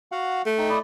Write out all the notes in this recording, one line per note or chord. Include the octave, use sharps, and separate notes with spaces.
F#4 F5 F#5
A3
D#4 G5
E4 D5 D#5